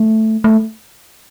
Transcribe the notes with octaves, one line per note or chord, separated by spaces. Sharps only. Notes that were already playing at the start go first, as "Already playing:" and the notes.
Already playing: A3
A3